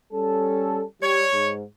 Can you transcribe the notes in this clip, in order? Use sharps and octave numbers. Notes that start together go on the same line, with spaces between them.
G3 C#4 A4
G3 C#5
G#2